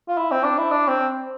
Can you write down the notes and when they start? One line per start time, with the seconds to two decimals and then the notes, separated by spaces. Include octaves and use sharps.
0.08 F4
0.17 E4
0.31 C4
0.44 D4
0.58 E4
0.71 D4
0.88 C4